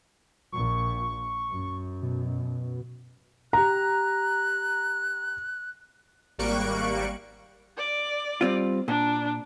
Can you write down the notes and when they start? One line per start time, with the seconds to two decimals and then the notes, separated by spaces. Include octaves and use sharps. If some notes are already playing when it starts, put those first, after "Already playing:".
0.52 A#1 A#2 C#6
1.50 F#2
2.02 B2
3.53 G4 A#5 F#6
6.39 G#1 G3 A#3 C#6 F#6 D7
7.77 D5
8.41 G3 C4 F4
8.88 A#2 D4